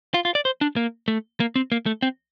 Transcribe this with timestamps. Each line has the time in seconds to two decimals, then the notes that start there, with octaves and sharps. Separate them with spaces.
0.14 F4
0.25 F4
0.35 D5
0.45 C5
0.61 D4
0.76 A#3
1.08 A3
1.40 A#3
1.56 C4
1.72 A#3
1.86 A3
2.02 C4